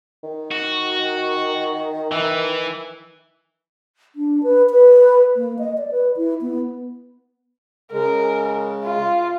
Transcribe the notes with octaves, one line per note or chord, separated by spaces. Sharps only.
D#3
F#4
E3
D4
B4
B4
A#3
D#5
D5
B4
E4
B3
C#3 G#3 A#4
F4